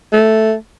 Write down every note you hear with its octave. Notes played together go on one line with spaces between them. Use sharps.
A3